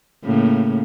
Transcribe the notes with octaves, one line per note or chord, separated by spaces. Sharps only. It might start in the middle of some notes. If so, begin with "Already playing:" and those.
A2 C#3 A#3